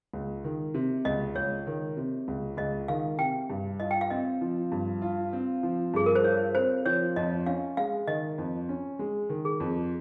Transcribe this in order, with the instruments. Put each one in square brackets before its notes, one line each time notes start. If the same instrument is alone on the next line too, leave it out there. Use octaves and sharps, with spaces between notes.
[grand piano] C#2
D#3
C3
[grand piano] C#2 [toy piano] D#5
[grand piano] C#2 [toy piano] C#5
[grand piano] D#3
C3
C#2
[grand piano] C#2 [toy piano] D#5
[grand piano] D#3 [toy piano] F5
[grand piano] C3 [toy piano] G5
[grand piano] G2
[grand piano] F4 [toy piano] D#5
[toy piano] G5
F5
[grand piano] C4 [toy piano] D#5
[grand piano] F3
G2
F4
C4
F3
[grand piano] G2 [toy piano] G#4
[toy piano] A#4
C5
[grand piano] F4 [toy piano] C#5
[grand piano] C4 [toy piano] C5
[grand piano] F3 [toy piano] C#5
[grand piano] F2 [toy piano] D#5
[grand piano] C#4 [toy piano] F5
[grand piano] G#3 [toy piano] F5
[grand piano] D#3 [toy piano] D#5
[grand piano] F2
C#4
G#3
D#3
[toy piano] G#4
[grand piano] F2